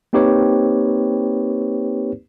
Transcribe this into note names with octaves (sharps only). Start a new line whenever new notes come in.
A#3 C4 D#4 G4 B4 C#5